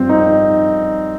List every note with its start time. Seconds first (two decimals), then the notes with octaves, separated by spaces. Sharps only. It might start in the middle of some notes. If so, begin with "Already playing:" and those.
Already playing: G2 F3 C4
0.09 D#4